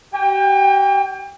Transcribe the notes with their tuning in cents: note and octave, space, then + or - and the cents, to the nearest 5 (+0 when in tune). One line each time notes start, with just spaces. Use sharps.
G4 -40 G5 +35